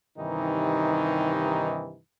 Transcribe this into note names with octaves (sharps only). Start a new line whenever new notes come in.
G2 C3 D#3 E3 D#4